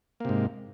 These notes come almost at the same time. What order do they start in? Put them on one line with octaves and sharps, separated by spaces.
A#3 C3 G#2